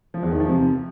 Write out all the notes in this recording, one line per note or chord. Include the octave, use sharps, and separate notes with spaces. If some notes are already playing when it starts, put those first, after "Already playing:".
F3
E2
D#3
F3
C3